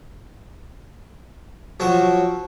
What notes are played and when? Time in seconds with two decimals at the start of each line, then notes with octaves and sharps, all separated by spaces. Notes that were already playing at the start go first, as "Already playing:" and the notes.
1.80 F3 F#3 F#4 C#6